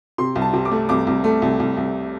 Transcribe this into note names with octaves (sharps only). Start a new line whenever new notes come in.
C3 C6
C2
A5
C3
D6
A3
C2 D6
C2
A3
C2
C2
C2